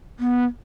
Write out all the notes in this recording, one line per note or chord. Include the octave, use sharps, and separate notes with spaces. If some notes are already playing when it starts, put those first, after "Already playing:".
B3